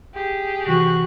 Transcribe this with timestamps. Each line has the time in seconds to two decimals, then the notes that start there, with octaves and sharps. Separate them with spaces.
0.14 G4 G#4
0.67 C3 E3 F3 F#4